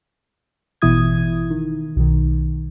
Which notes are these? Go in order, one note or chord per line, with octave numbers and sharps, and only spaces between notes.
A1 B2 E3 E4 D#6 G#6
D#3
B1 D#3